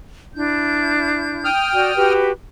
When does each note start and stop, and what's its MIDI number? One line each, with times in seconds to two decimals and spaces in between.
0.35 1.48 62
0.35 1.48 64
0.35 1.48 91
1.44 2.13 79
1.44 2.13 87
1.44 2.13 89
1.74 1.94 66
1.74 1.94 74
1.95 2.31 66
1.95 2.31 67
1.95 2.31 71